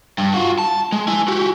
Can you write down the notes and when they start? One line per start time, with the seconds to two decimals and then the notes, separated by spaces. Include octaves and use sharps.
0.18 G2
0.34 F4 F#4
0.59 A5
0.92 G#3
1.08 E4 G#5
1.28 F#4 G4